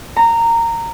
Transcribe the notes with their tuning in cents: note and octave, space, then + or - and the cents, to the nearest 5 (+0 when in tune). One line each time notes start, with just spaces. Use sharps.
A#5 -15